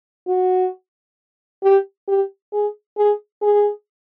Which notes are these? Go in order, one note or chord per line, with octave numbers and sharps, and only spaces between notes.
F#4
G4
G4
G#4
G#4
G#4